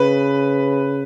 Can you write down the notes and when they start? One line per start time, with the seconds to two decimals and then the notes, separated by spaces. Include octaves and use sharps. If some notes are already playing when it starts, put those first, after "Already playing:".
Already playing: C#3 B4